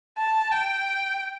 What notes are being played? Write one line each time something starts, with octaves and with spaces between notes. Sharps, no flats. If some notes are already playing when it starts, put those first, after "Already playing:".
A5
G5